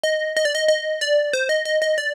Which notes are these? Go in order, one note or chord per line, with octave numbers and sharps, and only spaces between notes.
D#5
D#5
D5
D#5
D#5
D5
C5
D#5
D#5
D#5
D5